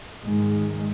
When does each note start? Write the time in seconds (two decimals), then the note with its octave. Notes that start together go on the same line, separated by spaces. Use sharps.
0.22 G#2 D#3 G#3